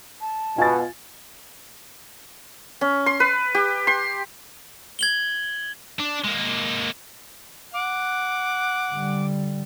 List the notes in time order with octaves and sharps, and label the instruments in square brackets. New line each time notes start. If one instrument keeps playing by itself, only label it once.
[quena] A5
[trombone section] B2 [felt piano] F4 [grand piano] G#5 A6
[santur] C#4
C6
B4
G4
C6
[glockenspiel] G#6 F#7 G7
[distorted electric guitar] D4
G#3 A#3
[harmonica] F#5 [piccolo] D6
[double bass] D3 G3